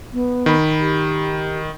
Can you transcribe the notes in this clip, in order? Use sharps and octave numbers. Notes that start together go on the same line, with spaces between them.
B3
D#3 B5
G4